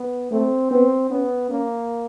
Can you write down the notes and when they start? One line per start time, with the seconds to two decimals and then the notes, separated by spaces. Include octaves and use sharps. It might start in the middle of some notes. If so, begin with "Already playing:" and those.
Already playing: B3
0.32 A3 C4
0.71 B3 C4
1.10 B3 C#4
1.50 A#3 C#4